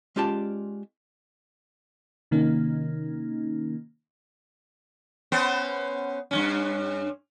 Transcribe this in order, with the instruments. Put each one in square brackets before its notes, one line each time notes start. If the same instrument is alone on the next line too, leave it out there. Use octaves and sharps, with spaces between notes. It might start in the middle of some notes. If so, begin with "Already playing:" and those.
[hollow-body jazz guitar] G#3 C#4 F4 G4 D5 A5
[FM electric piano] C3 D#3 A#3 C#4 D#4
[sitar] B3 C#4 C5
G2 B2 C#4